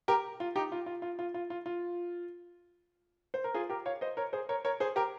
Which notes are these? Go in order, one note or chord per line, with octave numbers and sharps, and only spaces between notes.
G4 A#4
F4
D#4 G4
F4
F4
F4
F4
F4
F4
F4
C5
A#4
F4 G#4
G4 A#4
C#5 F5
C5 D#5
A#4 C#5
G#4 C5
A#4 C#5
A#4 C#5
G#4 C5
G4 A#4